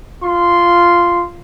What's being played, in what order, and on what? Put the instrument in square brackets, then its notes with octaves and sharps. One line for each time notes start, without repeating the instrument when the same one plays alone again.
[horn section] F4 C6